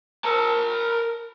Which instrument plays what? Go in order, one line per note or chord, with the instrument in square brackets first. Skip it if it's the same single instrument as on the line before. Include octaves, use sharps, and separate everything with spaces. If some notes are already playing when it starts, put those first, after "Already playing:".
[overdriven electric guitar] A#4 A5